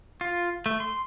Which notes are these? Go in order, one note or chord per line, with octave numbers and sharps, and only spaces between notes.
F4
A3
C6